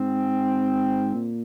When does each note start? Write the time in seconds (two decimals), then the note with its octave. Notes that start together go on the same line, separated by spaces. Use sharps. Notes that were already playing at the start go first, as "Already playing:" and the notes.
Already playing: G#2 C4
1.15 A#2